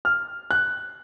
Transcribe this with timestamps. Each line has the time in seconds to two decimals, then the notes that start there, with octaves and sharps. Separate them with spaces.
0.05 F6
0.51 F#6